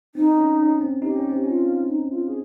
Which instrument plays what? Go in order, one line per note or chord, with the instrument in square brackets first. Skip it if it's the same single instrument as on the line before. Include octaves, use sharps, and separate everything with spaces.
[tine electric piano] C4 [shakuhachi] D#4
[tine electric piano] C#4
C#4
C4
[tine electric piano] D#4 [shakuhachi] G4
[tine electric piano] C#4
C4
[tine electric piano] C#4 [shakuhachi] F4
[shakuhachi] D#4
F4
G#4